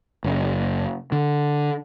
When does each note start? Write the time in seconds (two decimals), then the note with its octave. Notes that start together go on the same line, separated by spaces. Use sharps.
0.24 F#1
1.12 D3